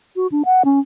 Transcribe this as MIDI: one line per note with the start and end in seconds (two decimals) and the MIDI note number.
0.16 0.27 66
0.32 0.42 62
0.45 0.63 78
0.65 0.79 61